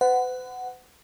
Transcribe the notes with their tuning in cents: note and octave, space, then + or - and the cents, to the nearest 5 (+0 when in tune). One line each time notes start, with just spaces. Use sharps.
B4 +45 F#5 +5